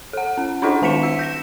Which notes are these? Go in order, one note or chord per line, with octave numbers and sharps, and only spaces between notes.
A4 F#5
C#4
D4 E4 F4 A4 D#5 F#5
D#3 G#3 A5 B6 C#7 E7
E6 B6
G6 A#6 E7